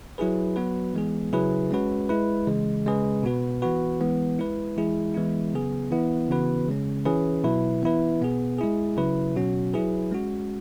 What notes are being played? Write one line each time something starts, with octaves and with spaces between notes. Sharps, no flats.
F#3 E4 G#4 B4
F#3 B3 F#4 B4
E3 G#3 B3 G#4
C#3 F#3 E4 G#4 B4
G#3 C#4 F#4 B4
G#3 E4 B4
C#3 E3 G#3
C#3 G#3 C#4 G#4 B4
B2 B3 F#4 B4
E3 B3 F#4 B4
E3 G#3 B3
G#3 E4 B4
E3 G#3 E4 G#4
E3 G#3 B3 E4
C#3 F#3 B3 G#4
E3 B3 E4
C#3 E3 B3 F#4 B4
C#3 G#3 C#4
E3 C#4 E4 G#4 B4
B2 F#3 E4 B4
E3 B3 E4 B4
B2 B3 G#4
G#3 E4 G#4
C#3 F#3 E4 B4
B2 F#3 C#4 F#4
F#3 E4 G#4 B4
G#3 C#4 F#4